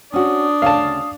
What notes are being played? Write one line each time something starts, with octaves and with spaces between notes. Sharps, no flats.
C#4 D4 F#4 D#6
D2 C#3 C#4 F5 A5